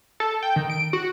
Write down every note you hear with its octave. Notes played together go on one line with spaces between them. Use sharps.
A4
G5
D#3
D7
F#4